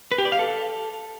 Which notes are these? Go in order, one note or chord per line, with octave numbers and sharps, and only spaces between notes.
B4
G4
D5
F5
A4